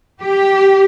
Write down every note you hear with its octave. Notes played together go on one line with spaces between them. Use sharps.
G4